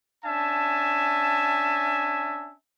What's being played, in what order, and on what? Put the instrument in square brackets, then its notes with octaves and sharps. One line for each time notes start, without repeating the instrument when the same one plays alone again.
[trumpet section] C#4 D4 E5 G#5 A5